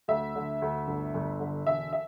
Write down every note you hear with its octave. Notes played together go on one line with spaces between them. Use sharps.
D2 E5
D3
D2
G1
G1
D3
E1 E5
E5